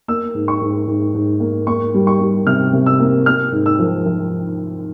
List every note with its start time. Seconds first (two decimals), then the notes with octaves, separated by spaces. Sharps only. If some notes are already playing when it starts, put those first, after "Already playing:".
0.08 A#3 E6
0.35 G#2
0.48 C#6
0.61 G#2
0.87 G#2
1.14 G#2
1.40 A#3
1.67 A#3 C#6
1.94 G3
2.07 C#6
2.20 G3
2.47 C3 F6
2.73 C3
2.86 E6
3.00 A#3
3.26 A#3 F6
3.52 G#2
3.66 E6
3.79 F3
4.06 F3